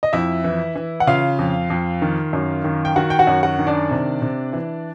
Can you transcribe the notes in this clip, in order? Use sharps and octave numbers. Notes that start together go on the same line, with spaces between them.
D#5
F2 E4 E5
E3
E3
F#5
C#3 F4 F5
F2
F2
D#3
F#2
D#3
G5
D#3 F#4 F#5
G5
F#4 F#5
F#2
F#4 F#5
D#3
D4 D5
C3
C3
E3